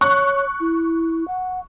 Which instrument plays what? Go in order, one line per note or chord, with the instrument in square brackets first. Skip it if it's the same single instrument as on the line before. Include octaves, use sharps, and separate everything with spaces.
[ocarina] C#5 [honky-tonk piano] C#6 F#6
[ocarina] E4
F#5